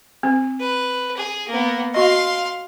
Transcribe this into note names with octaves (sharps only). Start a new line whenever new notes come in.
C4
B4
G#4
A#3 B3
F#4 D#5 F5 C6